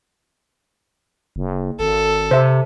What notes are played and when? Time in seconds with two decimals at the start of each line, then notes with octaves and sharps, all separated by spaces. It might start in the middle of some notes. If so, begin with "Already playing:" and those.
1.36 F#1
1.80 G#1 A4
2.31 C3 C5 E5